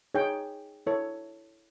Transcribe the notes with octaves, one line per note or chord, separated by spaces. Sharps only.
D#4 G#4 C#5 G5
E4 A4 C#5